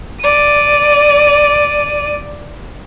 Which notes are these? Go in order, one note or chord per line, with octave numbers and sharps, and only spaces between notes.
D5 D#7